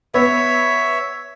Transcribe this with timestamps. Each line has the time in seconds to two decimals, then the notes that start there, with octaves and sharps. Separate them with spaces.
0.14 B3 C#5 E5